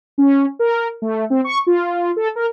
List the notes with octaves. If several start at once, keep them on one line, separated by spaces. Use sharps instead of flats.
C#4
A#4
A3
C4
C#6
F4
A4
A#4